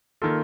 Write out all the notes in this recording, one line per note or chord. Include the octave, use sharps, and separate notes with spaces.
D#3 A#3 F4 A4